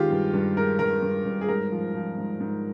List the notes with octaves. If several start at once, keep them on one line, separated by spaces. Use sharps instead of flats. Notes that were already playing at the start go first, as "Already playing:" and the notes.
Already playing: D#3 G#3 F4 G4
G2
G2
G#3 A#4
G2 A#4
G2
G2
G#4
G#2 A#4
F3
F3
G#2
G#2